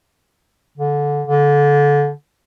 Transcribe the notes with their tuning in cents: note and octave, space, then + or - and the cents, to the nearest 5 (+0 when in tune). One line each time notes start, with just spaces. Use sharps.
D3 -15
D3 -25